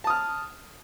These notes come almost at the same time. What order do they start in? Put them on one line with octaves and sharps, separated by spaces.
A5 D#6 F6